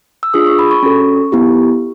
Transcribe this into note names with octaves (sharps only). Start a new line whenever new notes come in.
E6
D4 F4 G#4 D#6
C#6
B5
C#6
C#4 F#4 A4
B3 E4 G4